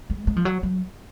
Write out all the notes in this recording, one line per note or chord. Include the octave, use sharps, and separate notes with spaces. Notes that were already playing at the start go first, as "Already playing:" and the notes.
G#3
G#3
F3
F#3
F#3